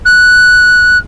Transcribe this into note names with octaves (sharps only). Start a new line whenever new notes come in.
F#6